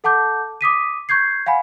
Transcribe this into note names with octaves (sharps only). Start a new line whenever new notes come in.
A4 F#5 A5 D6 G6
D6 D#6 B6 D#7
C#6 G6 G#6 C7
F5 F#5 G#5 B5